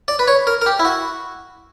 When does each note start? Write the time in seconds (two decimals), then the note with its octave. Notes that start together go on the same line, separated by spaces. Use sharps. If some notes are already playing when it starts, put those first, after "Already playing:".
0.08 D5
0.19 B4
0.28 C#5
0.47 A#4
0.62 A#4
0.66 G4
0.79 E4
0.85 F#4